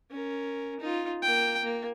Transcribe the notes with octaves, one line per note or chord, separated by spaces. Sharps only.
C#4 A#4
D#4 F4
A#3 G5
A#3